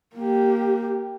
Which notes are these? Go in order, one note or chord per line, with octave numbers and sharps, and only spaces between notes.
A#3 G4